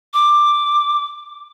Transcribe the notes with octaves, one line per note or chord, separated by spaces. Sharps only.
D6